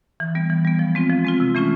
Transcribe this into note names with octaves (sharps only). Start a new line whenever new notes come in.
E3
G3 B3
E3
G3 B3
F3
G#3 C4 F4
F3
G#3 C4 F4
C3
E3 A3 C#4 F4